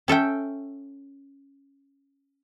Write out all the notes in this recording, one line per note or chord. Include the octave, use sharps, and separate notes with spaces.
C#4 A4 E5 G5